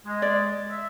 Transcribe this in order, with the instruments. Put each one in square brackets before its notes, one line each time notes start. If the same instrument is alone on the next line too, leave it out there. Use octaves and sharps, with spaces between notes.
[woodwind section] G#3
[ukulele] D5
[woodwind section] E5